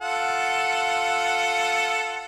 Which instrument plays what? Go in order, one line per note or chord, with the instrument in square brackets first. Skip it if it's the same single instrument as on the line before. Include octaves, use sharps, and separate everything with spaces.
[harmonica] F4 A4 F#5